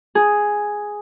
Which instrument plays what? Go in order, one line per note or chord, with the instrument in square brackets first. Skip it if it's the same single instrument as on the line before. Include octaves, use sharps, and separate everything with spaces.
[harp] G#4